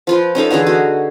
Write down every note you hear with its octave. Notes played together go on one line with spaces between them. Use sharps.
F3 F4 B4
C#4 D#4 A4 F5
D3 E3 D#4 G#4
F#4